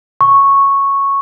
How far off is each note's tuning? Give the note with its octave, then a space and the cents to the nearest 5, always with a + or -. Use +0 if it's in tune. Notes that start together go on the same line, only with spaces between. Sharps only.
C#6 -5